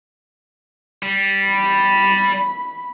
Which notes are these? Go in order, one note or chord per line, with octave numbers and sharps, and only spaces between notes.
G3
B5